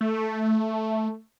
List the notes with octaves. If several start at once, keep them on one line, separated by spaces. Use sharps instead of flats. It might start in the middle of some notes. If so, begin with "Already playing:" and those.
A3